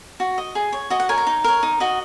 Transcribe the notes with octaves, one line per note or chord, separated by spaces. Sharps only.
F#4
D#5
G#4
C#5
F#4 D#5
F#5
A#4 C#5 G#5
A#5
D#4
A#4 C#5
D#4
F#4 D#5